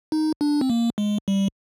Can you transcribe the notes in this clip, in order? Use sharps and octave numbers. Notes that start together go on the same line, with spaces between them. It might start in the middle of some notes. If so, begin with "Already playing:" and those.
D#4
D4
C4
A#3
G#3
G3